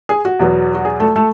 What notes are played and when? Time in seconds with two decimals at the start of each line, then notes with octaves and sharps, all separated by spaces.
0.09 G#4
0.25 F#4
0.39 E2 B2 F#3 B3
0.75 F#4
0.85 G#4
1.00 A3 A4
1.16 A3 A4